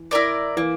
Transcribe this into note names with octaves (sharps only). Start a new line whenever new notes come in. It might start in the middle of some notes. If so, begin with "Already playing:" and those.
Already playing: E3
E4 A#4 D5
E3 A#3